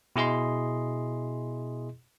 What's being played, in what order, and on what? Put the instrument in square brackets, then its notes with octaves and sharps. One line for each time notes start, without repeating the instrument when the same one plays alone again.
[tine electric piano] B2 E4 G#4 D#5 C6